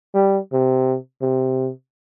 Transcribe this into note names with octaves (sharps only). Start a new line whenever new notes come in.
G3
C3
C3